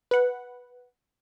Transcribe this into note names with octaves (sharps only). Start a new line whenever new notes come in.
B4 F#5